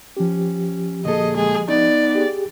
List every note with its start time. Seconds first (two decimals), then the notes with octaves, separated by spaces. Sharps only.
0.17 F3 C#4 G4
1.05 D2 A#2 G#4 A4 D#5
1.36 G#3 G#4
1.68 B3 D#4 D5
2.15 G4 G#4